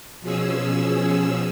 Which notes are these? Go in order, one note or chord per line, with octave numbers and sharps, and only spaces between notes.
B2 F3 C#4 G#4 E6